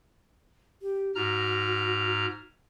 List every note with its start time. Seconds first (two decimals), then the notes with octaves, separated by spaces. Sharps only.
0.82 G4
1.15 G#2 F#4 A#5 F6